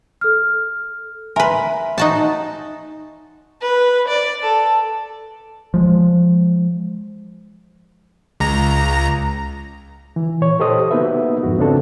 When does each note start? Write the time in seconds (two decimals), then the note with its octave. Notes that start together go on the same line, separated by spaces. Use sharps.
0.21 A4 F6
1.36 A#4 B4 E5 G#5 C6
1.98 D#4 F#4 A5
3.62 B4
4.08 D5
4.42 A4
5.74 F3 G#3
8.40 C#2 A#5
10.16 E3
10.41 A#2 C#5
10.60 G4 A4 C5 D#5 D#6
10.91 A#3 B3 D#4 F#4 B4 E5
11.43 F2 G#2 F#4
11.58 C#3 B3 C4 D4 F#4 A4